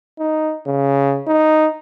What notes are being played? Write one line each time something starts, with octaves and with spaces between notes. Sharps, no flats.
D#4
C#3
D#4